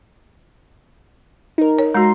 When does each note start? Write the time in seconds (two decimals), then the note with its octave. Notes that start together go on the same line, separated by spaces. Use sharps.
1.58 D#4 A#4
1.79 C#5
1.94 G#3 F#4 A#5 C6 C7